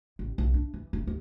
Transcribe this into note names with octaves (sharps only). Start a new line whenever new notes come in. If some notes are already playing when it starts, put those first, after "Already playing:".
A1
B1
D4
E3
E1
D#2